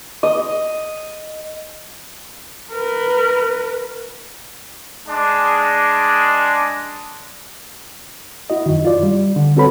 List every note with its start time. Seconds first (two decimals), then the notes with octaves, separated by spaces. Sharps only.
0.23 D#5
2.72 A#4 B4
5.07 G#3 D4
8.50 E4 F#4 D#5
8.66 F#2 D#3
8.85 F4 D5
9.03 G3
9.36 D3
9.57 C4 F#4 A4 B4 C#5 B5